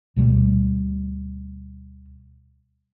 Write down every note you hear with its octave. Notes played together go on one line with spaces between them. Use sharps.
D2 B2 G3 A3